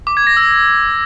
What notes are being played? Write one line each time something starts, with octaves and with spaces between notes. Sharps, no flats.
D6
G#6
A#6
E6